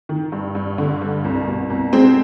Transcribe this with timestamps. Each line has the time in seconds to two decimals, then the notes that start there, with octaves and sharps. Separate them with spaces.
0.09 D#3
0.32 G2
0.55 G2
0.78 D3
1.01 G2
1.24 C2
1.48 B2
1.70 C2
1.93 G#3 C4